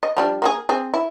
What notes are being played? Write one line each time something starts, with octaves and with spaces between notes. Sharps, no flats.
D#5
F3 G3 D4
A#3 F#4 G#4
C4 G#4
E4